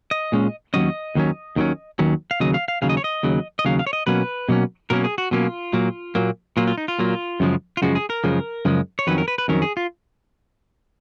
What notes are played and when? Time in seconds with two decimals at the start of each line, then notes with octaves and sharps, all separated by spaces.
0.11 D#5
0.32 A#2 G#3 C#4
0.74 D#2 D#3 F#3 C#4 D#5
1.15 D#2 D#3 F#3 C#4
1.56 D#2 D#3 F#3 C#4
1.99 D#2 D#3 F#3 C#4
2.31 F5
2.40 D#2 C#3 F#3 D#5
2.54 F5
2.68 F5
2.82 D#2 C#3 F#3 F5
2.89 D#5
2.97 C#5
3.04 D#5
3.23 D#2 C#3 F#3
3.59 D#5
3.65 D#2 C#3 F#3 F5
3.79 F5
3.87 C#5
3.93 D#5
4.07 B2 F#3 A#3 C#4 B4
4.49 B2 F#3 A#3 C#4
4.90 B2 F#3 A#3 C#4 A#4
5.04 G#4
5.18 F#4
5.31 B2 F#3 A#3 C#4 F4
5.73 A#2 F#3 A#3
6.15 A#2 F#3 A#3
6.57 A#2 F#3 A#3 F4
6.67 F4
6.78 D#4
6.88 F4
6.99 A#2 F#3 A#3
7.40 F#2 C#3 F3 G#3
7.77 F4
7.82 F#2 C#3 F3 G#3 F#4
7.95 G#4
8.10 A#4
8.24 F#2 C#3 F3 G#3
8.65 F#2 C#3 F3 G#3
8.99 C#5
9.07 F2 D#3 F#3 C#4 B4
9.18 A#4
9.28 B4
9.38 B4
9.48 F2 D#3 F#3 C#4 A#4
9.62 G#4
9.77 F4